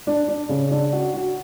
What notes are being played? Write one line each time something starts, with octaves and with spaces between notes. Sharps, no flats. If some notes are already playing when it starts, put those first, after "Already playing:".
D4
D4
C#3
D4
F#4
F#4